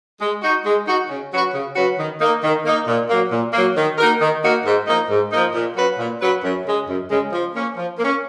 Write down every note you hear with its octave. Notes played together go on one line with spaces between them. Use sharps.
G#3
D#4 F#4
G#3
D#4 F#4
C#3
F#3 C#4 F#4 B4
C#3
F#3 C#4 F#4 B4
D#3
A#3 D#4
D#3
A#3 D#4
A#2
F#3 A#3
A#2
F#3 A#3
D#3
A#3 D#4 F#4 A#4
D#3
A#3 D#4 F#4 A#4
G#2
F3 A#3 D#4
G#2
F3 A#3 D#4
A#2
F#3 C#4 F#4 B4
A#2
F#3 C#4 F#4 B4
F#2
C#3 G#3
F#2
C#3 G#3
F3
A#3 C#4
F3
A#3
C#4